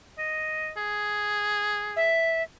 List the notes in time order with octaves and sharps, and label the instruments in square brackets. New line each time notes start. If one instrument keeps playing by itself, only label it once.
[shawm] D#5
G#4
[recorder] E5